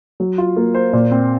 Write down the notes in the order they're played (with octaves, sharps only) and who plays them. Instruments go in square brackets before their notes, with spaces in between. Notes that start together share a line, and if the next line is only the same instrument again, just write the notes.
[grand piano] F#3
F4
A#3
C5
A#2
C4